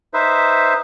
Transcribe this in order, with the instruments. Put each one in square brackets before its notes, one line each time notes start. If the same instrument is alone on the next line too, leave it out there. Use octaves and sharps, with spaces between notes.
[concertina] D#4 B4 C5 E5